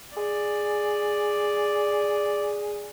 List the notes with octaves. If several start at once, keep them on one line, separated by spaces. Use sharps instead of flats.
G#4 D5